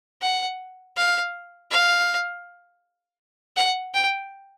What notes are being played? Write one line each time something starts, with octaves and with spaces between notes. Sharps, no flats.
F#5
F5
F5
F#5
G5